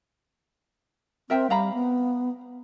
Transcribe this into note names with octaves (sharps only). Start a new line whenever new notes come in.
C4 A#4 E5 G5
G3 F5 A#5 B5
B3